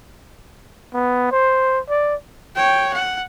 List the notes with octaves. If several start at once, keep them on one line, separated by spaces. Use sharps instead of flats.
B3
C5
D5
C#5 G5
F#5